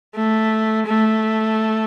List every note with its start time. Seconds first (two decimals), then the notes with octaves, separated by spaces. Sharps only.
0.15 A3
0.86 A3